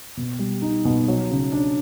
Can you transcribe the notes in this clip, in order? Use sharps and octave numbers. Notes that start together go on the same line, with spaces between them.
B2
G3
D#4
B2
F#3
C#3
D4